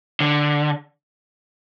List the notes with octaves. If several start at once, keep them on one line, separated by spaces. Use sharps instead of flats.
D3